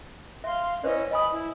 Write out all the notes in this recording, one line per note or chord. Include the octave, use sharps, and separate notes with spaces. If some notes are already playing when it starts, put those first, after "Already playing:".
E5 F5 C6
C#4 E4 B4 C5 D5 D#5
D#5 G#5 B5 D#6
E4